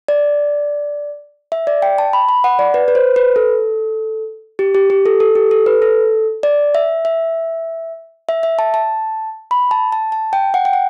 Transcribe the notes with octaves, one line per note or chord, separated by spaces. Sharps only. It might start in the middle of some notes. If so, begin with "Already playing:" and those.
D5
E5
D5
G5
A5
B5
B5
F#5
D5
B4
B4
C5
B4
A4
G4
G4
G4
A4
A4
G4
A4
B4
A4
D5
E5
E5
E5
E5
A5
A5
B5
A5
A5
A5
G5
F#5
G5
F#5